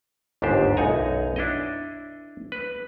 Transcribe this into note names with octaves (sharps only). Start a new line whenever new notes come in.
G1 D#2 G#2 D4 G4 C5
B1 F#2 D#4 F#5 G#5 A#5
D4 E4 C#5 D#5
B4